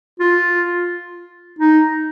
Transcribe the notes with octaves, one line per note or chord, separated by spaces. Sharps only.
F4
D#4